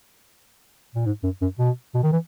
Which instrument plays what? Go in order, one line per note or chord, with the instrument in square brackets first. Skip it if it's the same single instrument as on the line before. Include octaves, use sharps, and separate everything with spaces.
[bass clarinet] A#2
G#2
F#2
F#2
B2
B2
D#3
E3